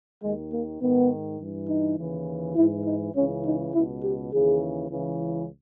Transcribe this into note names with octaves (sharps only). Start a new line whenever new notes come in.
D#2 D#3 G#3
A#3
G#2 D#3 B3
G2 E3
D#4
D#2 C#3 E3
G#2 E3 E4
D#4
C#2 C#3 E3 C#4
D#4
C#2 B2 E4
G4
D#2 C#3 E3 G#4
C#2 C#3 E3